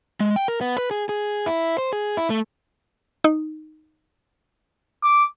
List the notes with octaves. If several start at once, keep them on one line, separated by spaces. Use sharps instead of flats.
G#3
G5
A#4
B3
B4
G#4
G#4
E4
C5
G#4
E4
A3
D#4
D6